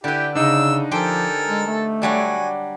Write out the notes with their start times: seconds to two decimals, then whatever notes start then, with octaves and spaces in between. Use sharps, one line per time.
0.04 D3 E4 G4 B4 G5
0.35 C#3 D4 D#4 D#5 E6
0.91 F3 G4 A4 A#4 C5 G5 G#5
1.46 G#3
1.67 A3
2.02 F#3 G3 D4 F#4 G#5